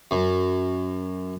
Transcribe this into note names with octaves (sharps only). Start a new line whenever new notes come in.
F#2